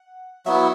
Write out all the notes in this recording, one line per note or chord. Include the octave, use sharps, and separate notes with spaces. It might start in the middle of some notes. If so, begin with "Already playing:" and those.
Already playing: F#5
F#3 B3 E4 E5